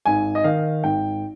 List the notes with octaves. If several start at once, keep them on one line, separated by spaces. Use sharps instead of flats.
G#1 G#5
D#5
D#3 F5
G#1 G5